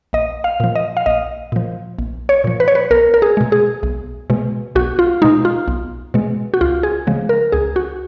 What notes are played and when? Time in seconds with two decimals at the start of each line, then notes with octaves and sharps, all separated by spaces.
0.13 A#1 D#5
0.44 F5
0.60 A#2 F3
0.75 D#5
0.97 F5
1.06 A#1 D#5
1.52 A#2 F3
1.99 A#1
2.29 C#5
2.44 A#2 F3
2.60 B4
2.68 C#5
2.75 B4
2.91 B1 A#4
3.14 A#4
3.22 G#4
3.37 B2 G#3
3.52 G#4
3.83 B1
4.30 B2 G#3
4.75 B1 F#4
4.99 F4
5.22 B2 G#3 D#4
5.45 F4
5.68 B1
6.14 B2 G#3
6.54 F#4
6.61 C#2 F4
6.83 G#4
7.07 C#3 F3 G#3
7.29 A#4
7.52 C#2 G#4
7.76 F#4